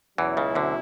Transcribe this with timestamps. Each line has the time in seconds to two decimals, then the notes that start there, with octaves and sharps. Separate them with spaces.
0.18 E2 B2 E3 F#3 C#4 E4
0.37 C#2 C#3
0.55 D2 D3